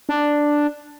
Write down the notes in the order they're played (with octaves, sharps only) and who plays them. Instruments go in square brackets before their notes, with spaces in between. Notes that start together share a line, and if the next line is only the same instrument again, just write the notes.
[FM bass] D4